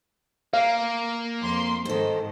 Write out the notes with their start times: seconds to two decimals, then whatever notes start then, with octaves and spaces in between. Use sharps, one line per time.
0.53 A#3 F5
1.42 F2 C6
1.85 G#2 D#3 A4 C5